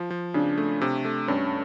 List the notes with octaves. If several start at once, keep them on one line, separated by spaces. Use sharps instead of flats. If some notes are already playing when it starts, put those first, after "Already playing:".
Already playing: F3
F3
C#3 D4
A3
C3
A3
G2 C#4